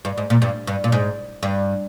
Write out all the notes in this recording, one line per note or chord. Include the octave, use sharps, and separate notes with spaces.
G2
G#2
A#2
G2
G2
A#2
G#2
G2